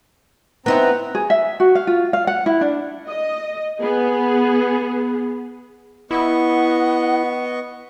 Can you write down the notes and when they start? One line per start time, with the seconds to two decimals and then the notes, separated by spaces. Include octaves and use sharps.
0.66 B3 C4 D#4 E4 A#5
1.15 G#4
1.30 E5
1.60 F#4
1.75 F5
1.87 F4
2.13 F5
2.27 F#5
2.46 E4
2.61 D4
3.07 D#5
3.81 B3 G#4
6.11 B3 E4 D#5 F#5 C#6